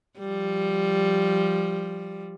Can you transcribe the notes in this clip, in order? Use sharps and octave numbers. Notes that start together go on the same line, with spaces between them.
F3 G3